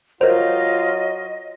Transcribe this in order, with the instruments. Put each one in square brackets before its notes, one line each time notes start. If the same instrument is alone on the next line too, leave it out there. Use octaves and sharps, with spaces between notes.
[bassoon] F#3 [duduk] F4 [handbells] A#4 C5 [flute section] D#5